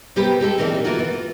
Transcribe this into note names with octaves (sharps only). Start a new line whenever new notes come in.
C3 G3 B3 G4 A#4 B4
G#3 G4 A4
A#2 E3 A#3 C4 D#4 A4
E3 A3 A#3 F4 F#4
E3
F4